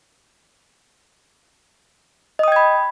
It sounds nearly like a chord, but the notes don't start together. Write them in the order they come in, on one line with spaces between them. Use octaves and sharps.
D#5 D#6 G5 G#6 B5